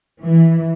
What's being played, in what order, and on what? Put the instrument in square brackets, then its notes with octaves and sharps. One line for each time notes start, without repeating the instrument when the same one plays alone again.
[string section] E3